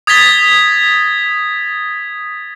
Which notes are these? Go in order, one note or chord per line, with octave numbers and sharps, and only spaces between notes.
D#6 G#6 A6 B6 G7